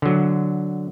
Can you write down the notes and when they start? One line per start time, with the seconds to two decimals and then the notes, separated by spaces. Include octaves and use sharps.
0.02 D3 F#3